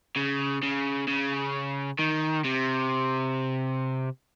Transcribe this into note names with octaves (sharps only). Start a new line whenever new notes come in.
C#3
C#3
C#3
D#3
C3